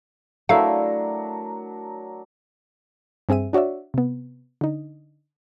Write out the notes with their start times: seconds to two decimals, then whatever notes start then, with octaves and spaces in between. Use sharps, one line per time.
0.49 F#3 A3 D4 E4 A#4 F5
3.29 G2 C4 G#4 E5 D#7
3.53 D4 F#4 C#5 D5 E5
3.94 C3 B3
4.61 D3 D#4